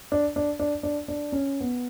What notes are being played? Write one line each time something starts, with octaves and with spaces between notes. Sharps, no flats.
D4
D4
D4
D4
D4
C#4
B3